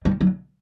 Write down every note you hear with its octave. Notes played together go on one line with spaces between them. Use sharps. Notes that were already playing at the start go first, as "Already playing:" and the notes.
G3
F#3